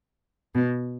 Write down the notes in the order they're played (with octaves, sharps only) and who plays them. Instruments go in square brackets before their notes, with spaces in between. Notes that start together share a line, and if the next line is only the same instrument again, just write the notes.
[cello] B2